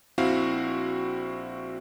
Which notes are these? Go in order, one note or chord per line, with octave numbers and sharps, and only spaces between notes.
A#1 C4 E4 F#4 F5